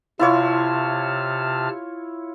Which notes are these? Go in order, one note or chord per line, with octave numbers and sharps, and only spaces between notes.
C3 E4 F4 C#5 A5 F6